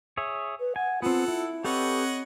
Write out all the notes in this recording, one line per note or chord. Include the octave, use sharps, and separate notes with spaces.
G#4 C#5 E5
B4
F#5 G#5
B3 C4 F4 A4 F#5
E4
C4 G4 A4 B4 C#5 D#5 F#5